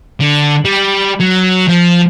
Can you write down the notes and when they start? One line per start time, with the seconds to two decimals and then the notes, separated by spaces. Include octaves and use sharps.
0.21 D3
0.65 G3
1.20 F#3
1.68 F3